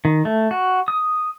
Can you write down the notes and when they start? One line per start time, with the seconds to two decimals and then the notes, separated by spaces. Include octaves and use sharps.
0.05 D#3
0.25 A3
0.51 F#4
0.88 D#6